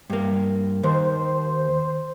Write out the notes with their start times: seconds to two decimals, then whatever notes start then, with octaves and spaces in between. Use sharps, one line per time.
0.10 G2 A#3
0.83 D#2 C5